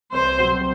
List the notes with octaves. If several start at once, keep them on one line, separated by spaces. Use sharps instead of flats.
C2 C5
B2 F#3 C4